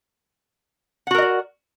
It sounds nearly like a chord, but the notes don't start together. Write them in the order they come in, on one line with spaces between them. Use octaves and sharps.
F#5 F#4 A#4 D#5 D5